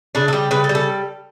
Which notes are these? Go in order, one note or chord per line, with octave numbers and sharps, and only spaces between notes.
C#3 D4
A4
G3 G4
C#3 B4
A4
G3
A4